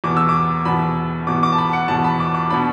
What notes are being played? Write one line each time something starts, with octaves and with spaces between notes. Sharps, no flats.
E2 B2 B3 D6
E6
D6
E2 B2 B3 B5
E2 B2 B3 D6
D6
A5
B5
F#5
E2 B2 B3 A5
B5
D6
D6
B2 B3 D4 B5